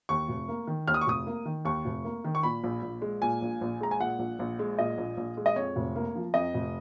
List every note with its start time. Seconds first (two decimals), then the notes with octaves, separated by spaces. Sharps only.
0.09 D#2 C#6
0.28 F1
0.48 A#3
0.67 D#3
0.87 D#2 F6
0.94 D#6
1.01 C#6
1.07 F1 D#6
1.27 A#3
1.45 D#3
1.65 D#2 C#6
1.85 F1
2.05 A#3
2.24 D#3
2.35 C#6
2.43 A#2 B5
2.64 A#1
2.82 A#1
3.02 G#3
3.22 A#2 G#5
3.42 A#1
3.61 A#1
3.81 G#3 A#5
3.91 G#5
4.00 A#2 F#5
4.19 A#1
4.39 A#1
4.59 G#3
4.78 A#2 D#5
4.98 A#1
5.17 A#1
5.37 G#3
5.46 D#5
5.56 F2 C#5
5.76 F1
5.96 A#3
6.15 F3
6.34 F2 D#5
6.54 F1